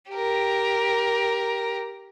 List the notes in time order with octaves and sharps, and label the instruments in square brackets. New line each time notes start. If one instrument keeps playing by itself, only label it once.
[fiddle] G4 A#4